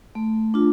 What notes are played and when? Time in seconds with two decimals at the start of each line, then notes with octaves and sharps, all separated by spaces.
0.15 A3
0.54 D4 F4